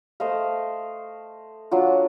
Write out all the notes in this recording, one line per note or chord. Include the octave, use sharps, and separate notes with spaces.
A3 C5 D#5 F5
F#3 D4 F4